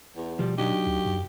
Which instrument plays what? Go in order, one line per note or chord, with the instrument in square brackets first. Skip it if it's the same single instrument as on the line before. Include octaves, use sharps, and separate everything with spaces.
[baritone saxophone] E2
[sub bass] B2 [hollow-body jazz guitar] F3 G3
[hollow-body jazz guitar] F#3 D4 D#4 [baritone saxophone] G4
[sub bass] D2
F#2